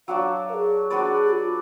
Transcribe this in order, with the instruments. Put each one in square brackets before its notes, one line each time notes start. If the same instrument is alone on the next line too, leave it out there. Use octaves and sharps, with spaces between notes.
[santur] F#3 D4 F#4 D5 [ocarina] F5
[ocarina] A#4
G#4
[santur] D4 F#4 B4 D5 [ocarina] G#4
[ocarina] F4